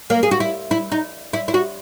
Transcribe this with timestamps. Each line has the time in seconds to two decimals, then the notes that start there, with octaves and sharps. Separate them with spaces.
0.10 A#3
0.23 G#4
0.31 F#4
0.40 E4
0.71 E4
0.92 D#4
1.33 E4
1.48 E4
1.54 F#4